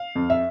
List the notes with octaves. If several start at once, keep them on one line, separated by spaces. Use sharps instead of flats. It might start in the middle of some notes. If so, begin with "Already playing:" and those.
Already playing: F5
F2
E5